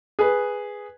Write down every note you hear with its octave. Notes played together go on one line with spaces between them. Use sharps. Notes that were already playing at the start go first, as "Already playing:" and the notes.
G#4 B4